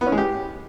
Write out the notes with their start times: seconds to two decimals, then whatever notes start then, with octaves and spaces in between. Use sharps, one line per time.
0.01 B3
0.07 C#4
0.12 G#3
0.18 G4